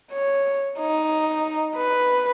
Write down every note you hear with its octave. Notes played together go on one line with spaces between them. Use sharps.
C#5
D#4
B4